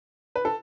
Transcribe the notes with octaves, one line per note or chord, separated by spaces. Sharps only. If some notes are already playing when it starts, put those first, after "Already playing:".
B4
A4